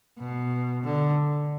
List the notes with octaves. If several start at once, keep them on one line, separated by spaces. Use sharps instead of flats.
B2
D3